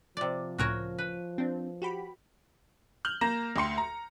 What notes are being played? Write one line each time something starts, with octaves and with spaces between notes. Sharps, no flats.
C3 F3 D5
C#2 A2 C#3 F#4 A#4 C#5
B4
C4 D4
F#4 G4 B5
F6 G6 F#7
A#3 A#5 A#6 E7
D2 G5 C6 C#7
A#5